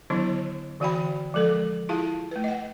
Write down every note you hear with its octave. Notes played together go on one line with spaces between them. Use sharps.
D3 D#3 F#3 B3 D4 E4
D3 E3 F#4 F5 G5 B5
F3 G#3 A4 A#4
E4 F4 G#4 F5 A5
A3 B4
D#5 F#5